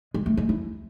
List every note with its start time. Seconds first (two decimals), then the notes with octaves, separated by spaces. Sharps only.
0.14 G#3
0.26 A3
0.37 G#3
0.49 E4